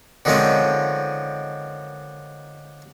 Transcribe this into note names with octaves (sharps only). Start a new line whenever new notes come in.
D3 D#3 F3 G#3 C4 C#4